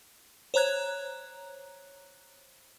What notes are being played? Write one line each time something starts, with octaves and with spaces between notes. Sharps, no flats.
C5 C#5 A#5 F#6 G#6